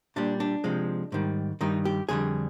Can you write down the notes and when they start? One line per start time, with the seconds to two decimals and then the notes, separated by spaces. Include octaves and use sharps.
0.16 A#2 G3 D4
0.40 D4
0.64 C3 F3 G#3
1.12 G#2 D#3 G3
1.61 G2 D#3 G3 D#4
1.85 G4
2.09 F2 D3 G3 G#4